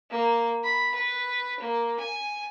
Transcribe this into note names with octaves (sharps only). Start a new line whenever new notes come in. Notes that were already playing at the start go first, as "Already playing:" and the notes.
A#3
B5
B4
A#3
G#5